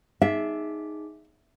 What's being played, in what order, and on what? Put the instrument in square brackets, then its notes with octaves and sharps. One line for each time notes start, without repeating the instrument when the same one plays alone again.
[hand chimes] D#4 G#4 [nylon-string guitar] E5